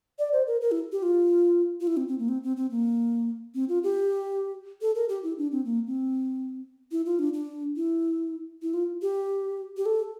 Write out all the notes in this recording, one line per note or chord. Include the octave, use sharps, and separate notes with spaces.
D5
C5
A#4
A#4
E4
G4
F4
F4
E4
C4
C4
A#3
C4
C4
C4
A#3
C4
F4
G4
A4
A#4
G4
E4
D4
C4
A#3
C4
E4
F4
D4
D4
E4
E4
F4
G4
G4
A4